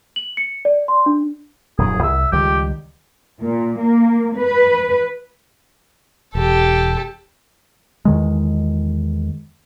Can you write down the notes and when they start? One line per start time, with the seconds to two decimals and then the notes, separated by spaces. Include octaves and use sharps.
0.16 F#7
0.37 C#7
0.65 D5
0.88 C6
1.06 D4
1.78 D#1 F#2 D#3 G#4
2.03 C2 E5
2.32 C#2 D#3 G3 G4
3.41 A#2
3.79 A#3
4.38 B4
6.35 E1 G4 A4
8.05 E2 D#3 G#3